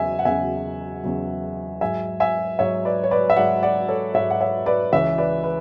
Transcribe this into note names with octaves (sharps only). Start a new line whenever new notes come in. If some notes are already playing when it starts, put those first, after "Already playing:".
Already playing: E2 C#3 F#3 E5 G#5
F#5
E2 C#3 F#3 E5 G#5
E2 C#3 F#3
G#2 F#3 E5 G#5
E5 G#5
G#2 F#3 C#5 E5
B4 D5
C#5
B4 D5
E5
G#2 F#3 D5 F#5
D5 F#5
A4 C#5
G#2 F#3 C#5 E5
F#5
C#5 E5
B4 D5
C#2 C#3 E3 C#5 E5
B4 D5
B4